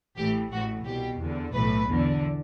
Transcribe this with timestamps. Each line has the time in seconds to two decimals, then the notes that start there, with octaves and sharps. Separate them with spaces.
0.18 A1 A2 E3 G4
0.51 A1 A2 E3 F#4
0.85 C2 B2 G4
1.19 E2 D3
1.52 B1 A2 E3 B4
1.87 E2 D3